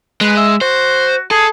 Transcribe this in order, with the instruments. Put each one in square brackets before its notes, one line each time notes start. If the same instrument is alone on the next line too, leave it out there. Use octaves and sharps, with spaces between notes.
[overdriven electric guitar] G#3 [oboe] B4
[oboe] E5
[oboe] F#4 [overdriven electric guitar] C5
[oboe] G#4 [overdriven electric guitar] A4